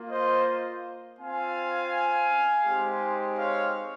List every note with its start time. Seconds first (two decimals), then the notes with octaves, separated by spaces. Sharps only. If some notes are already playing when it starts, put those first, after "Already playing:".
Already playing: A#3 F4
0.10 C5 D#5
1.19 C4 F4 F5 G#5
2.65 G#3 C4 D#4 G4
3.37 C#5 F5